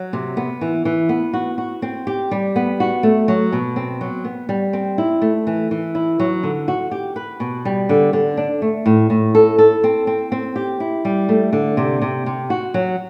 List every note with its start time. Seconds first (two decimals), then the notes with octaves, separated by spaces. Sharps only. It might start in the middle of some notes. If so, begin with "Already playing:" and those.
Already playing: F#3
0.13 C3
0.37 B3
0.61 E3
0.85 E3
1.09 B3
1.33 F#4
1.58 F#4
1.82 C4
2.07 G4
2.31 G3
2.56 B3
2.80 F#4
3.03 A3
3.28 F#3
3.52 B2
3.76 C4
4.01 F#3
4.25 B3
4.49 G3
4.73 C4
4.98 E4
5.22 A3
5.47 E3
5.71 E3
5.95 E4
6.20 F#3
6.43 D3
6.68 F#4
6.91 G4
7.16 B4
7.40 B2
7.65 G3
7.89 D3
8.13 D3
8.37 D4
8.62 A3
8.86 A2
9.10 A2
9.35 A4
9.58 A4
9.84 C4
10.07 C4
10.32 C4
10.56 G4
10.80 E4
11.05 G3
11.29 A3
11.53 D3
11.77 C3
12.02 C3
12.26 C3
12.50 F#4
12.74 F#3